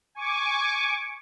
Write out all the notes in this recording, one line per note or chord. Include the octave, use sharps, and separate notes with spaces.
G#5 C#6 D6